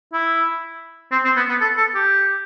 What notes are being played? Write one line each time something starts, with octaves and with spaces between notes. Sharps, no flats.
E4
C4
C4
B3
B3
A4
A4
G4